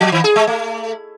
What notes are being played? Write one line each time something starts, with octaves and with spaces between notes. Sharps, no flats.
F3
D#3
G#4
G#3
A3